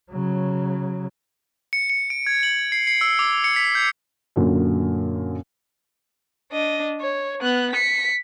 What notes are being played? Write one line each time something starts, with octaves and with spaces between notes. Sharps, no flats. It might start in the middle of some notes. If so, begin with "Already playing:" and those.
C#3 F#3
C#7
C#7
D7
G#6
F#7
C7
C7
E6
D6
C#7
B6
G6
F#2 A#2 D3 F#3
D4 D#5
C#5
B3 F#6
B6 C#7